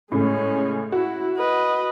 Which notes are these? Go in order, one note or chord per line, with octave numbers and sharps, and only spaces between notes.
A2 C#3 G#3 C#4
E4 F#4
B4 D#5